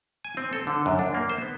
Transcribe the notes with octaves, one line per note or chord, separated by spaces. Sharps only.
G#5
C4
A4
D3
F#2
D4
A#3
C5
B3